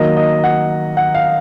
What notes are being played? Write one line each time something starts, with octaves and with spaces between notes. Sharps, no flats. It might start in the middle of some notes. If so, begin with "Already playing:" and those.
Already playing: D#3 F#3 A#3 D#5
D#5
F#5
F#5
F5